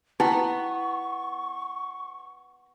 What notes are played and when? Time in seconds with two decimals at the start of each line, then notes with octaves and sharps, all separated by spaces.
0.20 B3 D#4 E4 G5 C#6